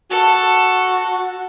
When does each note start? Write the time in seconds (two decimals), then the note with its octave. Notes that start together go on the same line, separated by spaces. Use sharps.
0.11 F#4 A4